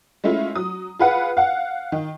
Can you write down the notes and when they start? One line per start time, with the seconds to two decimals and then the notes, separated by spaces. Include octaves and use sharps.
0.24 G#3 A3 C#4 E4 F4
0.55 F#3 D#6
0.99 F4 G#4 B4 F5 F#5
1.37 F5 F#5
1.92 D#3